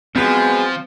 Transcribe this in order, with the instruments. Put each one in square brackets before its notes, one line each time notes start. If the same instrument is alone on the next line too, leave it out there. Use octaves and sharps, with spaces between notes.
[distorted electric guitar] F3 [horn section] F#3 G#3 B3 [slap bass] C4